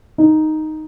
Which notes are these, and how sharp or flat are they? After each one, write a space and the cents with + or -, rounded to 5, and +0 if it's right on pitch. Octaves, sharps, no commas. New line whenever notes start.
D#4 +0